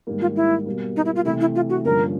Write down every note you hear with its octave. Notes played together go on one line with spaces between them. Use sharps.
G#2 D#3 G3 A#3
F4
E4
B2 G3 A#3
D#4
E4
F4
C3 E3 A3 E4
E4
F4
F#4
G2 D3 F3 A#3 C#4 A#4